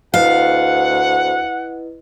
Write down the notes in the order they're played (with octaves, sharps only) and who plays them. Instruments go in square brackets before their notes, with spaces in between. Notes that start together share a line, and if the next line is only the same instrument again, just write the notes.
[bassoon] D2 [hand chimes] E4 B4 D#5 [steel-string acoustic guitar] F5 [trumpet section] F#5